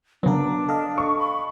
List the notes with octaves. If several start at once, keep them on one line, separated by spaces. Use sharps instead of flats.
C#3 F#3 B3 D4 A#4
A4 D#5 F5
C#6
B5